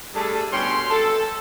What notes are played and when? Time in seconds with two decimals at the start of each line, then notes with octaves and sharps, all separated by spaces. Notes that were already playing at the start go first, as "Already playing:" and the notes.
0.15 G3 A3 D4 G#4 A4
0.52 G2 B2 C#4 G5 C6
0.90 A4